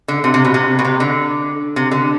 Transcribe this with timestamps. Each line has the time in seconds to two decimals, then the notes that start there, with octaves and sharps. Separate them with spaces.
0.08 D3
0.24 C3
0.34 C3
0.45 B2
0.54 C3
0.79 B2
0.85 C3
1.00 D3
1.76 C3
1.91 D3